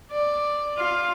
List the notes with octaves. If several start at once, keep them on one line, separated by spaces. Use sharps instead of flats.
D5
F4 F5